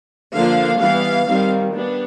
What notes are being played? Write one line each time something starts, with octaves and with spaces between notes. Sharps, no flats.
D3 F3 A#3 D4 F5
E3 G3 B3 F5
D#3 G3 C4
G3 B3 D4